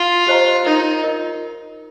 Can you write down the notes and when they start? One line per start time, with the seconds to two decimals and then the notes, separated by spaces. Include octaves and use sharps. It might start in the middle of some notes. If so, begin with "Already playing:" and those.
Already playing: F4
0.27 G4 C5 D#5 A#5
0.65 D#4 F4 A#4 D#5
1.03 F4 A#4 D#5